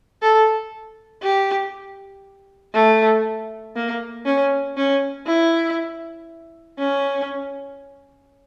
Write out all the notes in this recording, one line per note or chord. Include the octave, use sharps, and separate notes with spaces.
A4
G4
A3
A#3
C#4
C#4
E4
C#4